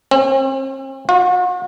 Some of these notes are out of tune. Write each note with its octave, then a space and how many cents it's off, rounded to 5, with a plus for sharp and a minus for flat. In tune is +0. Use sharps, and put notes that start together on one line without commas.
C4 +45
F#4 -45